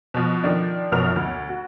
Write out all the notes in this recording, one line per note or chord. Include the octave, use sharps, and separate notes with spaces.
B2 F3
D#3 F3 D4
B1 F#2 B2 F3 A#4 F7
D2
F#4